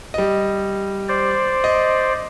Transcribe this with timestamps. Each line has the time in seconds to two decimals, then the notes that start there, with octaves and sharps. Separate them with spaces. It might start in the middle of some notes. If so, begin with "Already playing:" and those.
0.14 G3 D#5
1.09 C5 D5
1.64 D#5